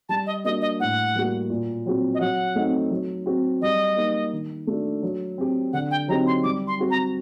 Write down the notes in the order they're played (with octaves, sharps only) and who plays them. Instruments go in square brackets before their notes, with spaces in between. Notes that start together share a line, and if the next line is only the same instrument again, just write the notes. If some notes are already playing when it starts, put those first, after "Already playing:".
[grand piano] G3 [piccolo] A5
[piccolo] D#5
[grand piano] A#3 D4 F#4 [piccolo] D#5
[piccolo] D#5
[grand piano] A2 [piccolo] F#5
[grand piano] G3 A#3 F#4
A#2
F#3 C4 F#4
[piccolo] D#5
[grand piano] F#3 [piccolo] F#5
[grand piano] A3 C4 D#4
F#3
C4 F#4
[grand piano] G3 [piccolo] D#5
[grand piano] A#3 D#4 G4
D#3
A3 D4 F#4
F#3
C4 G4
[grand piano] D3 [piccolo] F#5
[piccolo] G5
[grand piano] F#3 C4 D#4 G4 [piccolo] A#5
[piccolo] C6
[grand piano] G3 [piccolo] D6
[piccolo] C6
[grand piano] C4 F#4
[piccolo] A#5